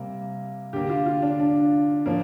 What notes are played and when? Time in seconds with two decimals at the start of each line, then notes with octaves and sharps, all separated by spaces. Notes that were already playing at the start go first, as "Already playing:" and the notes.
Already playing: C3 G3 A#3
0.73 D3 A#3 G4
0.89 F4
1.06 F4
1.22 D4
1.40 D4
2.06 F3 A#3